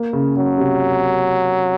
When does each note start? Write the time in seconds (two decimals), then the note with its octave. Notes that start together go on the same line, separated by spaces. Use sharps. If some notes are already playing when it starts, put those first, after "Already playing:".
Already playing: A#3
0.13 C#3
0.36 C#3 F#3
0.58 C3